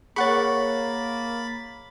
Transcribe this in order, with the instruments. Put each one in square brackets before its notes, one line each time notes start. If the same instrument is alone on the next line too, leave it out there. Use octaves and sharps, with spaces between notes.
[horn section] A#3 [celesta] G#4 C#5 [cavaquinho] F#5 C#6 [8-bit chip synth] B5 A6